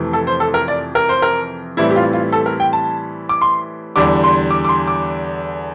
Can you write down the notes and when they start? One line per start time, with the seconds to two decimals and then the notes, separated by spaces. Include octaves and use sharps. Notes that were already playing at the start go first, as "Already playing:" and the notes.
Already playing: F2 C3 E3 A3
0.13 A4
0.27 C5
0.40 A4
0.54 A#4
0.68 D5
0.95 A#4
1.09 C5
1.22 A#4
1.77 A2 E3 G3 C4 E4
1.90 G4
1.96 F4
2.13 F4
2.32 A4
2.46 A#4
2.60 G5
2.73 A5
3.29 D6
3.42 C6
3.96 E2 D3 G3 D6
4.24 C6
4.51 D6
4.65 D6
4.69 C6
4.87 D6